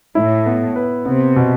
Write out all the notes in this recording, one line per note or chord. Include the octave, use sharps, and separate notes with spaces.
A2 E4
B3
B4
C3 B3
B2